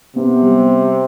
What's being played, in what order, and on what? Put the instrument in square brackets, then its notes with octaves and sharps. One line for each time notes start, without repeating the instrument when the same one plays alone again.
[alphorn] C3 [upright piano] B3
[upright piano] G3